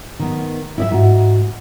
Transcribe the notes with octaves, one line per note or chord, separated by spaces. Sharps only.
D#3 B3
E4 D#5 E5
G#2 F#4